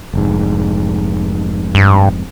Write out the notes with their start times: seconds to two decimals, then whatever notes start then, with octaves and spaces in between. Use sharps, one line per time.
0.14 F1 G#2
1.75 G2